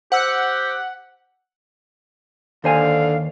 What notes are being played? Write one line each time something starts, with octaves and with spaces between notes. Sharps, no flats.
G4 C5 F#5 E6
D#2 D3 C5 F5 G#5